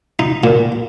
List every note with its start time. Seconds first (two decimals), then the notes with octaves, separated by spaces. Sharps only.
0.19 D#4
0.44 A#2